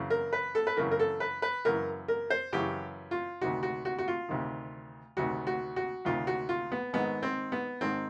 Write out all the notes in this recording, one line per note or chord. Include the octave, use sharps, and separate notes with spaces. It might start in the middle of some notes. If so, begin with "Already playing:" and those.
Already playing: F#2 C#3 E3
A#4
B4
A4
B4
F#2 C#3 E3 A#4
A#4
A4
B4
B4
F#2 C#3 E3 A#4
A#4
C5
F#2 C#3 E3 G4
F4
D2 C3 D#3 F#4
F#4
F#4
F#4
F4
D2 C3 D#3
D2 C3 D#3 F#4
F#4
F#4
D2 C3 D#3 F4
F#4
F4
B3
G#1 G#2 D#3 B3
C4
B3
G#1 G#2 D#3 C4